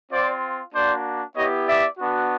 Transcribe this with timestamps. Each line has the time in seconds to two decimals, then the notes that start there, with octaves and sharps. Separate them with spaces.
0.11 C4 F4 C5 D5
0.73 A#3 D4 F#4 C5 D5
1.36 B3 E4 G4 C#5 D#5
1.67 D5 E5
1.99 B3 D4 F#4